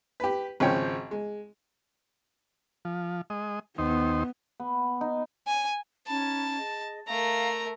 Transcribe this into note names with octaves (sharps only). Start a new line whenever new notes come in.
G4 B4
G#1 C#3 F3 C#5 G5
G#3
F3
G#3 D#5
D#2 B3 D#4 C5
B3
D#4
G#5
C#4 D#4 A5 B5
G#4 D#5
A3 A#4 F5 A#5